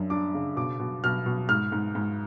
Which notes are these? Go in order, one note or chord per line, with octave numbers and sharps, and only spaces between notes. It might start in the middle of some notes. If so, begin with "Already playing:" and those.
Already playing: F#2 D4
D4 D6
C#3
B2 D6
B2
B2 F6
B2
G#2 F6
G#2
G#2